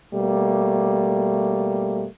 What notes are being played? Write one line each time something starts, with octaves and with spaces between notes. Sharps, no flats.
B2 G3 A3 A#3